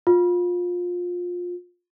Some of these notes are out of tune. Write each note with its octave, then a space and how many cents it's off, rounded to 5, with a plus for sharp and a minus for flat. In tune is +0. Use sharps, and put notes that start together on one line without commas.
F4 +25